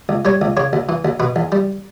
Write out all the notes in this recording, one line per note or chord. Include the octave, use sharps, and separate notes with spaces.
C#2
G3 C#5
C#2
C#3 C#5
D2
E3
D2
B2 B4
E2
G3